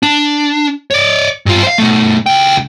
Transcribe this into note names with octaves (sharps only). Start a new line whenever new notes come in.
D4
C#5 D5
G2 F4
C5 F5
B2 A3
C#2 G5